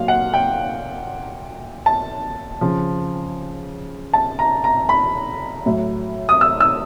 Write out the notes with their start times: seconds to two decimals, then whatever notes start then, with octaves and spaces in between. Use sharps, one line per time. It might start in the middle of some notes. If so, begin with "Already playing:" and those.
Already playing: A#2 F#3 F5
0.08 F#5
0.34 G5
1.86 A5
2.61 C#3 F3
4.13 A5
4.39 A#5
4.64 A#5
4.89 B5
5.66 A2 F#3
6.29 D#6
6.41 E6
6.60 E6